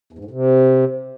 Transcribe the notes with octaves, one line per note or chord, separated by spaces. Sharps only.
E2
G#2
A2
C3